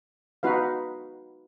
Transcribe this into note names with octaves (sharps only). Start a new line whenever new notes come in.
D#4 F#4 B4 F5